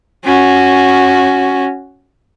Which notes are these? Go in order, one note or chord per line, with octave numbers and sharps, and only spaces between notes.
C#4 F#4